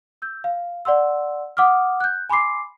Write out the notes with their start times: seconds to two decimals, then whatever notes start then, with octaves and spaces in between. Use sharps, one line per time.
0.22 E6 G6
0.44 F5
0.85 D5 F#5 C6 E6
1.57 F#5 D6 D#6 F6
2.00 F#6 G6
2.29 G#5 B5 C6 D6 C7